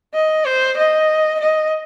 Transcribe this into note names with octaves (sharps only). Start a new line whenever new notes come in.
D#5
C5
D#5
D#5